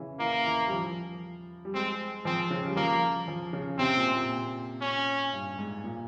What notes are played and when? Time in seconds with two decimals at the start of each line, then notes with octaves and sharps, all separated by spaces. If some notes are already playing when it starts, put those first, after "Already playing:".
Already playing: C#3 E3
0.20 E3 A#3
0.45 E3
0.67 G3
0.72 F3
1.65 G3
1.74 G#3 C4
2.25 F3 C4
2.50 C#3
2.68 G3
2.76 F3 A#3
3.28 F3
3.53 C#3
3.79 C3 C4
3.97 A#2
4.13 A#2
4.81 C#4
5.33 G2
5.59 G#2
5.84 A#2